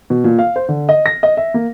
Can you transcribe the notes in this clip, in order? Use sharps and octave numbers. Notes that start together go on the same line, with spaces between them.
B2
A#2
F5
C5
D3
D#5
A#6
D#5
E5
A#3